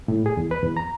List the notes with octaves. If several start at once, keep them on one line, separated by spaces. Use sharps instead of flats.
A2
G#4
E2
B4
E2
A#5